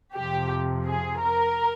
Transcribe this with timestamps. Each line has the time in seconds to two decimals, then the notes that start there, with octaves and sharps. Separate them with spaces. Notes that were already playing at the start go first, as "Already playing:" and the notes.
0.15 F2 C3 F3 G4
0.86 G#4
1.20 A#4